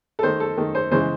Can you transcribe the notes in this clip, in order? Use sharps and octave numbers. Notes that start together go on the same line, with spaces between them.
A4
D#3 A3 C5
A4
D#3 A3
C5
C#3 E3 G#3 C5